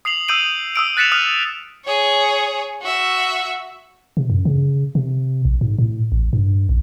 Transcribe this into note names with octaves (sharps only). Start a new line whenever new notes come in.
D#6 C7 F7 F#7
D#6 E6 G6 D7 D#7 F#7
D#6 E6 D7
F#6 A6 B6 C#7 E7 F7
D#6 F6 F#6 D#7 F7
G#4 C#5
F#4 E5
C3
F#2
C#3
C3
A#1
G#2
A2
A1
G2
A#1